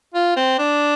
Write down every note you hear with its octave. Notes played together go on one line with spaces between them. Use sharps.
F4
C4
D4